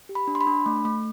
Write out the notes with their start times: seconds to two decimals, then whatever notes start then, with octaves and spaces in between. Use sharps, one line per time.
0.09 G4
0.15 B5
0.27 D4
0.35 C6
0.41 B5
0.47 D4
0.66 A3
0.85 A3